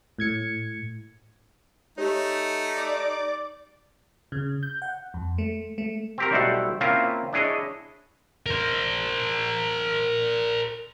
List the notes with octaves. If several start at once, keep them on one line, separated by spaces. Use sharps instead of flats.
A2 G#6 C#7
A3 D#4 G4 C#5
D5 D6
C#3
G6
F#5
F2
A3
A3
C4 G4 A#4
B1 G3 A3 E4 C5 F#5
A#3 C4 C#4 E4 F4
D4 E4 G#4 C#5 D#5
A#4 C5